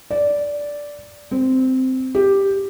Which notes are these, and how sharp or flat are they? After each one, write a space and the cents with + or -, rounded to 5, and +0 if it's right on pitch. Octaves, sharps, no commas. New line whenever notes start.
D5 -10
C4 -10
G4 +5